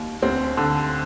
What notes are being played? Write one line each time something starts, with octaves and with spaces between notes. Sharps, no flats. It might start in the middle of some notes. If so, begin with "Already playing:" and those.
Already playing: D#2
D2 C4
D3